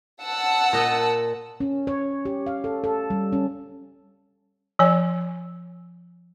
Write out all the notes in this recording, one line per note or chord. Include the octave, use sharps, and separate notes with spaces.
F#5 A5 E6
A#2 D#5
C#4
C#5
G4
F5
A4
A4
G3
C#4
F3 C#5 G#5